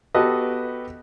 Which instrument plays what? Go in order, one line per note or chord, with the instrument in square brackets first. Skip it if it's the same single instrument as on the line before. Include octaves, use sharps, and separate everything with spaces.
[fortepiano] B3 F#4 G4 A4 B4 D#5